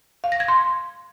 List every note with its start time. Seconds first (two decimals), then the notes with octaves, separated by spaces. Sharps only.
0.24 F5
0.32 A#6
0.40 G#6
0.48 C6